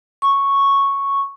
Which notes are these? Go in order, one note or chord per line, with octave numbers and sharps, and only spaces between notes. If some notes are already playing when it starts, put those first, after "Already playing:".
C#6